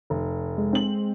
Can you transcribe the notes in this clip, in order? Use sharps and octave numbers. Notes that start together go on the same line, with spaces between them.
F1
G#3
C4 F#7